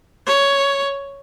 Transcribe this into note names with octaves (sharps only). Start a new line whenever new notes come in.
C#5